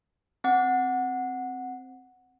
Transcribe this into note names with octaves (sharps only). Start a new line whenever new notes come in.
C4 F#5